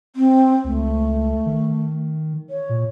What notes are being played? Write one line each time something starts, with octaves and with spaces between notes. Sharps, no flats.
C4
C#2 A3
D#3
C#5
A#2